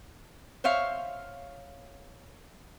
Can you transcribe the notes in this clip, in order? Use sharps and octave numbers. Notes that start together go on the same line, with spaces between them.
C5 C#5 E5 F5